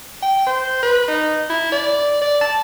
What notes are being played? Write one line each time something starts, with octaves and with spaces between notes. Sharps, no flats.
G5
C5
B4
D#4
E4
D5
D5
A5